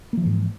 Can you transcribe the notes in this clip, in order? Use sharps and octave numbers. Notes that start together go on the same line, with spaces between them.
G#2 E3 F3 A#3